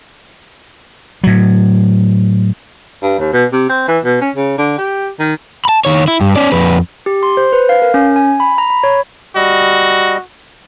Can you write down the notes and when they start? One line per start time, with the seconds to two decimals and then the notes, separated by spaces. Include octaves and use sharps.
1.24 A2 F#3
3.02 G2
3.19 D#2
3.33 B2
3.52 C3
3.69 C4
3.88 E3
4.04 B2
4.21 C#4
4.36 C#3
4.58 D3
4.78 G4
5.19 D#3
5.65 A5 B5
5.85 D#3 C#5
6.08 E4
6.21 G2
6.36 C#4 D5
6.52 F2 B4
7.06 G4
7.23 C6
7.37 C5
7.52 B4
7.69 F5
7.82 A#4
7.94 C#4
8.16 G#5
8.40 B5
8.58 A#5
8.70 B5
8.83 C#5
9.36 G3 F#4 D#5